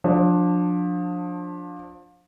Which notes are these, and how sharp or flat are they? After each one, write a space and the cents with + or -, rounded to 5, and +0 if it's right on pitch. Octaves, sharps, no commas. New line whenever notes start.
F3 +30 D4 +0